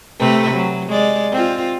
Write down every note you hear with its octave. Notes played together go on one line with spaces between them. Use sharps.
C3 A3 B4
F#3
G#3 D5
C4 F4